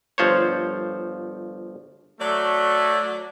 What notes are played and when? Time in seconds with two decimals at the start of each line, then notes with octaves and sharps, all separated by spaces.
0.18 G1 F3 C5 C#5
2.21 F#3 A3 D5